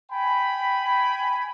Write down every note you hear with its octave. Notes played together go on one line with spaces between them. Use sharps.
G5 G#5 B5